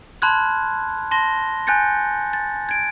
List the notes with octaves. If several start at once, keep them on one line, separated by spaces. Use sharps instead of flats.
A5 B5 C6 F6 F#6 G#6
A5 C6 A#6 G7
G#5 F#6 G6 A6 C#7
A6
G#6 D7